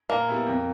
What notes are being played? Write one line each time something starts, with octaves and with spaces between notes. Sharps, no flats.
A#2 A#3
G3 B3 E4
F2